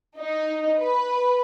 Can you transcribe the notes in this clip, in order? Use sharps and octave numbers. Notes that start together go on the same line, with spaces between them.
D#4
B4